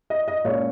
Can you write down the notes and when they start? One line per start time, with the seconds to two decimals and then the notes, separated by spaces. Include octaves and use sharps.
0.10 D#5
0.28 D#5
0.45 A#2 G#3 C#4 C#5